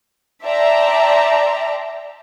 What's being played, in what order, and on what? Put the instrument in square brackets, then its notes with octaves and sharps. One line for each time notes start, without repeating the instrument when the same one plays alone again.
[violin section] D5 E5 G5 A5 A#5 C6